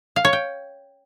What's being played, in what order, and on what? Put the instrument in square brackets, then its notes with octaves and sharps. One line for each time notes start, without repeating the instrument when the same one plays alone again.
[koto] F5
C#5
G5